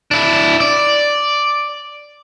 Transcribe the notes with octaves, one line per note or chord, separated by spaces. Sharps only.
D4 E4
D5